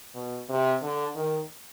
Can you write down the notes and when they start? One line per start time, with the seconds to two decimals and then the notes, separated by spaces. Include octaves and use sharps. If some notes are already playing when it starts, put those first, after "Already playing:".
0.15 B2
0.49 C3
0.82 D3
1.15 D#3